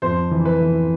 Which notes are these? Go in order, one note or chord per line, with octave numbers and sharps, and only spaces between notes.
F2 C5
E3
B4
E3